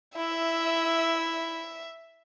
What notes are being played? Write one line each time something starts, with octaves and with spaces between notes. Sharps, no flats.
E4 E5